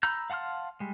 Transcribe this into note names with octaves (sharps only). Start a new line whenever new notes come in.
A#5 B5 E6 G6
F5 F#5 A5 C6 F6
G3 G#3